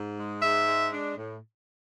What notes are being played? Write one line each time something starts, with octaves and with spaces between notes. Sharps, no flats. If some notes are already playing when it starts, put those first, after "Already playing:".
Already playing: G#2
G#3
G#2 E5
G#3
D4
A2